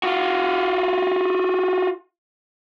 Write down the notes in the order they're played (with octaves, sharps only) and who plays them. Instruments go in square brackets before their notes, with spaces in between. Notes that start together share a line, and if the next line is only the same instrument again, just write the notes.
[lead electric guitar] F4 F#4